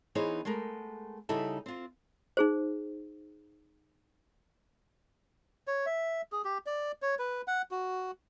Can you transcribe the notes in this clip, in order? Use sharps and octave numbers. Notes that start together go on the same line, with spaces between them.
E3 B3 D#4 G#4 C5 C#5
G#3 A3 B3 A#4
C#3 G3 D#4 E4 A4
C4 F4
D#4 G#4 C5
C#5
E5
G#4
G4
D5
C#5
B4
F#5
F#4